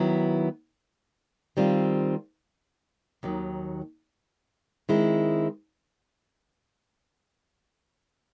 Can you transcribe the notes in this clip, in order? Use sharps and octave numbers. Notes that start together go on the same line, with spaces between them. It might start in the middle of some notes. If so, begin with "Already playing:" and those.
Already playing: D#3 F#3 B3 E4
D#3 G3 C4 F4
D#2 D#3 F#3
D#3 G#3 C4 E4